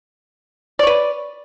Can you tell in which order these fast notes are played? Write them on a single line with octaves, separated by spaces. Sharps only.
D5 C#5 B4